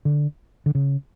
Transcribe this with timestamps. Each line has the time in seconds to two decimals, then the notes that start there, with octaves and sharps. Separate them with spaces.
0.05 D3
0.66 D3
0.75 C#3